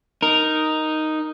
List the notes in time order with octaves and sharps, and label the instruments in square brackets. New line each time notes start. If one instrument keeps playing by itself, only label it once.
[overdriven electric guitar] D#4 [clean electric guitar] A#4